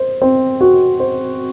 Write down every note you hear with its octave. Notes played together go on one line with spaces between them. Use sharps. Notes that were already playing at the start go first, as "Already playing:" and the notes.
Already playing: C5
C4
F#4
C5